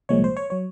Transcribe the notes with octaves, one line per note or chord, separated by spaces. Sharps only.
C2 A#2 F3 G#3 C#5
C5
C#5
F#3 C#5